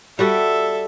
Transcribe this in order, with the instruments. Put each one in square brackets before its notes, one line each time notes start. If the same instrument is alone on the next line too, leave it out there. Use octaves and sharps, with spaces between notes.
[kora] G3 F#4 D5 [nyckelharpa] A4 E5